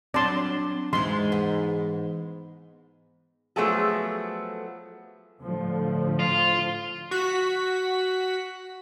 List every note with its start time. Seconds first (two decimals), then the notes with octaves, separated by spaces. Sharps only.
0.14 F#3 C4 D4 D5 A5 C6
0.93 E2 G#2 E3 G#3 C6
1.32 B3
3.56 F3 F#3 A3 B3 G#4 A4
5.39 A2 D3 F3
6.19 F4
7.11 F#4 B6